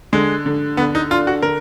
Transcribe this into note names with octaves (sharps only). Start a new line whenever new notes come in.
D3 G#3
D3
D3 B3
D#4
D4 F4
F#4
D3 A#4